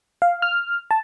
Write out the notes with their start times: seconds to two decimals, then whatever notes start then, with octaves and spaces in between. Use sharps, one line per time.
0.22 F5
0.42 F6
0.91 A5